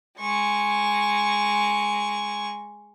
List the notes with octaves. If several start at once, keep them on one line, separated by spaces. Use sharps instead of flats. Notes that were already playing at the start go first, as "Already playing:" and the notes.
G#3 C#6